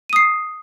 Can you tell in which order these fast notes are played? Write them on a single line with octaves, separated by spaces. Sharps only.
D#7 D#6 C7